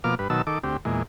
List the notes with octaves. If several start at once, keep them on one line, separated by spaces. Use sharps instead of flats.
B2 F3 A#3 D6 F6
G2 B4
B2 D#3 F#3 A5 E6
D#3 A4 D6
D2 C4 G4
E2 A#2 G#3